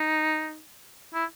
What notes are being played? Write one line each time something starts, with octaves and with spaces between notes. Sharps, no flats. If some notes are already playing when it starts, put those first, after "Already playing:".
Already playing: D#4
E4